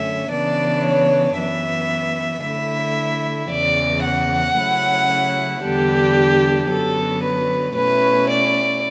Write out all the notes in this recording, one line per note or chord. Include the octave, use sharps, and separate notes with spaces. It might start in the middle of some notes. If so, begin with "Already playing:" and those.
Already playing: F#2 D3 A3 C#4 E5
C#3 E3 B3 D4 D5
C#5
F#2 E3 B3 E5
D3 A3 E4 E5
E2 C#3 E3 D5
F#5
C#3 F#3 A3 C#4 E4
E2 D3 G3 B3 D4 G4
F#2 D3 F#3 B3 A4
B4
B2 A3 C#4 E4 B4
D5